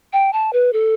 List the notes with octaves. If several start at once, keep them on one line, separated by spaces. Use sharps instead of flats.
G5
A5
B4
A4